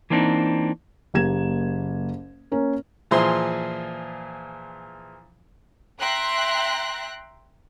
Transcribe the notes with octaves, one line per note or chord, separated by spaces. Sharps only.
E3 A#3 C4 D4 D#4
F#1 A#3 G4 G#6 E7
A#3 C#4 A#4
A#2 E3 F3 G#4 A#5 C6
E5 G5 A#5 C6 F#6 A#6